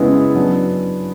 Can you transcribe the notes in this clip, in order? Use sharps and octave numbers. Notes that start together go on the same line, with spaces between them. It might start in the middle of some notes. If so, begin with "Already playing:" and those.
Already playing: C#3 G#3 B3 E4
F#3 B3 D4